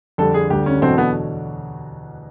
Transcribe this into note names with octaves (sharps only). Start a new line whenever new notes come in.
F2 D3 G3 A4
G#4
D2 D3 G3 G4
C#4
E2 B2 F#3 A3 C4 D4
B3